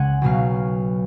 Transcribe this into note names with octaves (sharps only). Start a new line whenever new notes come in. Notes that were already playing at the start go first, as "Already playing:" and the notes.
Already playing: C#2 C#3 F#5 G#5
B1 B2 F#3 F5